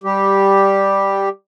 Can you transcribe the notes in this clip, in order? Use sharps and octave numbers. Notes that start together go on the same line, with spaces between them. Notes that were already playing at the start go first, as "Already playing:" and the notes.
G3 G4